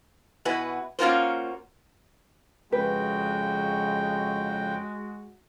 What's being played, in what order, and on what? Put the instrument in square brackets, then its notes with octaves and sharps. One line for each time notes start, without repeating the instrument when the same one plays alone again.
[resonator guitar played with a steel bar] B2 E4 F#4 B4 G#5
A#3 C#4 F4 F#4 A#4 C5
[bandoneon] F2 C#3 G5 [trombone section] G#3 F#4 [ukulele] B4